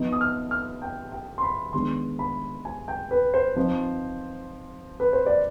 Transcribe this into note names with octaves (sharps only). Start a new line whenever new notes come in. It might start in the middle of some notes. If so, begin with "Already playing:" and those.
Already playing: F3 B3 D#4
D#6
F6
F6
G5
G5
C6
B5
D#3 G#3 B3 D4 C6
B5
G#5
G5
B4
C5
F3 C4 D#4
B4
C5
D5